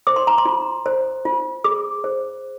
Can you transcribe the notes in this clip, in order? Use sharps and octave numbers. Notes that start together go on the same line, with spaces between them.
C5 D6
C6
A#5
C6
F4
C5
F4
G#4 D6
C5